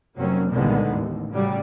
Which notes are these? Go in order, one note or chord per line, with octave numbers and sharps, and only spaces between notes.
F1 F#3 A#3 C4 C#4
C2 A#2 D3 D#3 G#3 B3
A1 D#2
A2 C#3 F#3 G3